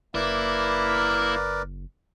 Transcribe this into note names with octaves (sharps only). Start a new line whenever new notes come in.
F#1 A#3 E4 A#4 B4 D5